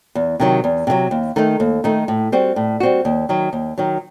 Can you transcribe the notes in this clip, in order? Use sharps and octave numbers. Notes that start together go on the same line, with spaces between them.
E2
C3 D#3 F#3
E2
C3 D#3 F#3
D#2
D#3 A3 D#4
D#2
D#3 A3 D#4
A2
G3 C4 F#4
A2
G3 C4 F#4
D#2
D#3 F#3
D#2
D#3 F#3